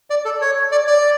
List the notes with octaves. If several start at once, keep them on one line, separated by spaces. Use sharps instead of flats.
D5
A4
C#5
D5
D5